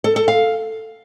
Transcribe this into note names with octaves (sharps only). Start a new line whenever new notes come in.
A4
A4
F5